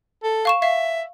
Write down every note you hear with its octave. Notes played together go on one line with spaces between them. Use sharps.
A4
F5 C#6 E7
E5 F5